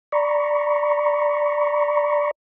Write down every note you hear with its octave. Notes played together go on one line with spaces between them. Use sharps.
D5 A#5 B5 C#6